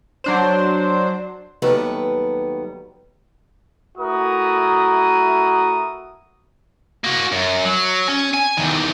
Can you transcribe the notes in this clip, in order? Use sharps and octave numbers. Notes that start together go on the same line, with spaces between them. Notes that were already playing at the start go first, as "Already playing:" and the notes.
F#3 D4 C5
D#2 F#3 G3 A3 B3 B4
A3 E4 F#4 A#4 D#6
A#3 F#4
F#2
F#3
C#4
G#5
E2 D#3